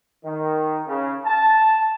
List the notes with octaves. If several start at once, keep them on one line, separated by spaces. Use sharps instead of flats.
D#3
C#3
A5